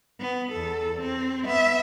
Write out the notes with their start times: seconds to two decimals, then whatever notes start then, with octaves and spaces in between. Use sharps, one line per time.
0.21 B3
0.52 E2 A4
1.01 C4
1.45 B3 E5